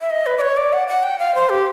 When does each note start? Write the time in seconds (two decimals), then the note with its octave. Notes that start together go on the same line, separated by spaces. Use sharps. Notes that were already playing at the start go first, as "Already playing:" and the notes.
0.01 E5
0.11 D#5
0.26 B4
0.38 D5
0.41 C#5
0.57 D5
0.73 F#5
0.88 F#5
1.03 G5
1.19 F5
1.35 C5
1.49 G4